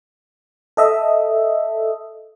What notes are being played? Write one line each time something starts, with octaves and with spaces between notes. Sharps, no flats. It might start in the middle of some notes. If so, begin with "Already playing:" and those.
A4 D#5 E5